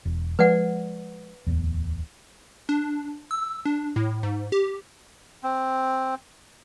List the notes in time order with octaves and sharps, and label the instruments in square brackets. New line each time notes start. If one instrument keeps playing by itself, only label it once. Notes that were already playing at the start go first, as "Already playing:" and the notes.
[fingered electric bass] E1
[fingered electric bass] F3 G#3 [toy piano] B4 D5 F#5
[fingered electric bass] D1 E2
[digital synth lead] D4
E6
D4
A2
G#2
G4
[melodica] C4